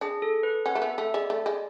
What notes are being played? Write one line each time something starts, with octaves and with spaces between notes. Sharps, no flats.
D4 G#4
A4
B4
C#4 F#5
A3
B3 E5
A3 E5
G#3 D5
A3
G#3